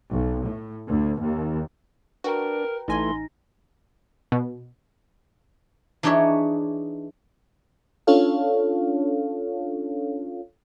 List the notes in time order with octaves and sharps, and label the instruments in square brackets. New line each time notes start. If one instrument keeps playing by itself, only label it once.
[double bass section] B1
A2
D2
D#2
[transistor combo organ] D4 [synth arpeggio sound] F#4 [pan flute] A#4 [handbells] B4 G5 A#5
[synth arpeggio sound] A1 G#5 [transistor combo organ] E3 A3 [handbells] D#4 A#6 [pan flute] C6
[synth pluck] B2
[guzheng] E3 D4 D#4 G#4 C#5 E5
[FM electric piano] C#4 D4 F4 A4 C#5 F5